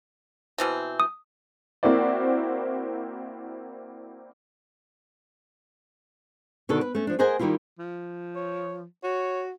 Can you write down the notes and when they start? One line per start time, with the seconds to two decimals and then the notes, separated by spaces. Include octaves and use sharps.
0.58 B2 E3 C4
1.00 D#6
1.83 A#3 C4 E4 F#4 C5 D5
6.69 B2 D3 D#3 A4
6.81 B4
6.95 A3 C#4
7.07 F3 D4
7.19 G#4 A#4 C5 D#5 F#5 G#5
7.39 D#3 G3 A#3 E4 F4
7.79 F3
8.35 C#5
9.03 F#4 C#5